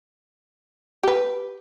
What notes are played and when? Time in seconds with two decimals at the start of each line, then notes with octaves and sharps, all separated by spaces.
1.03 G4 B4